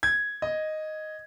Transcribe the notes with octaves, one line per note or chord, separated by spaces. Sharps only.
G#6
D#5